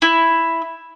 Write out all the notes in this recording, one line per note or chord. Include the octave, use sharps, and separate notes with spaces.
E4